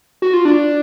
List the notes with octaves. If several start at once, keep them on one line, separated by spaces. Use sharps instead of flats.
F#4
F4
D4